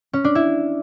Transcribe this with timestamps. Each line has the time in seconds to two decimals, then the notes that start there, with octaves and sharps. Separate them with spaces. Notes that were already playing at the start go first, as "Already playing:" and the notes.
0.13 C#4
0.24 D4
0.35 E4